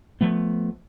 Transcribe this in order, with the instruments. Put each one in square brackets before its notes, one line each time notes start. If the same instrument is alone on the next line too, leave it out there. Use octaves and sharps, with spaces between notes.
[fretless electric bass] F3 A3 B3